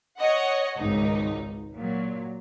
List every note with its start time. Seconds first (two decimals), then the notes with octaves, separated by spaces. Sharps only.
0.18 C#5 D#5 F#5
0.77 G#1 C#2 D#4
1.75 A#2 F#3